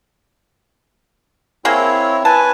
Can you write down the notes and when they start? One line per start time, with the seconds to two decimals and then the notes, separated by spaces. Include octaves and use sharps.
1.65 A#3 C4 E4 G#4 C#5
2.25 B4 G#5 A5